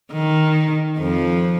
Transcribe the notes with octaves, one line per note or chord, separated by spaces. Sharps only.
D#3
F2 F3